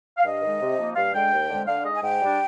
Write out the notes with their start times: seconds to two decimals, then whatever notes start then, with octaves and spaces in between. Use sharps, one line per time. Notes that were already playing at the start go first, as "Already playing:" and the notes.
0.18 F5
0.25 G2 D#5
0.42 D#3 G#3
0.61 C3
0.78 F3 A#3 D#4
0.96 G2 F5
1.14 D3 G#3 G5
1.32 D#2
1.50 D3 G#3 C4
1.67 D3 F5
1.85 G#3 D#4 D#5
1.95 G#5
2.03 G#2 G5
2.21 G3 D4